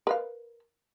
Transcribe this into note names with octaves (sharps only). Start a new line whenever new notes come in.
A#4 B4 F5